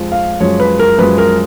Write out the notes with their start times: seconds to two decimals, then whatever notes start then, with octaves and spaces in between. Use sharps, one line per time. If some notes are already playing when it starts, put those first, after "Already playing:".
Already playing: F2 F3 G#3
0.12 F5
0.40 F#2 F3 G#3 C#5
0.60 B4
0.79 A#4
0.98 F#2 F3 G#3 B4
1.18 A#4